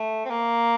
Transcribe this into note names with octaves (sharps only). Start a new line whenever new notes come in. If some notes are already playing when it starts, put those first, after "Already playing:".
Already playing: A3
C4
A#3